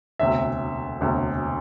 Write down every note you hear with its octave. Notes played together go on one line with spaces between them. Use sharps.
E1 D2 C3 E5
E1 D2 C3